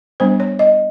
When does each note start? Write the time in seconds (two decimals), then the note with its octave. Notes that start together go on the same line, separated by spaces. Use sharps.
0.20 G3 B3 D4 C5
0.40 C#5
0.59 D#5